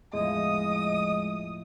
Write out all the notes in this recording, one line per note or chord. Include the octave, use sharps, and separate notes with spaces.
E2 A2 F3 G#3 D#5 D#6